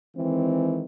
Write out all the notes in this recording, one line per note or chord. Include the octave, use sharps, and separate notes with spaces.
D#3 E3 G#3 C4